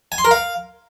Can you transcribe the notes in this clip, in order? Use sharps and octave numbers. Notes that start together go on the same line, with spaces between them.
G#5
C6
A#4
F5